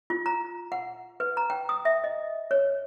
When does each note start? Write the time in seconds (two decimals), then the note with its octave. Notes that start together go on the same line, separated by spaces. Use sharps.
0.10 F4
0.26 A#5
0.72 F#5
1.20 B4
1.37 A#5
1.50 G5
1.69 D#6
1.85 E5
2.04 D#5
2.51 C#5